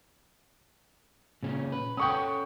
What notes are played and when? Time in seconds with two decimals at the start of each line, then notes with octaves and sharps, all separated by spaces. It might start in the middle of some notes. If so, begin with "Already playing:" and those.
1.43 A#2 C#3 C#4
1.72 B4
1.97 C#4 A4 F#5 G5 C#6 D#6